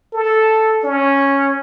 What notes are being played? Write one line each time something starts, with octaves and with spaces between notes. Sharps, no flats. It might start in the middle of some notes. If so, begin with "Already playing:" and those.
A4
C#4